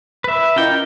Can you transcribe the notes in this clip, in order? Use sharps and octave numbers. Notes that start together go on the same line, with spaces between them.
B4 E5
C#4 E4 F4 A#4 D#5 G5